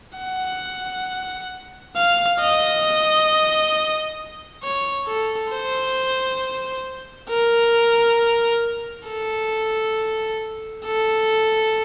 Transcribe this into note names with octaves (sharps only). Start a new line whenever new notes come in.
F#5
F5
D#5
C#5
A4
C5
A#4
A4
A4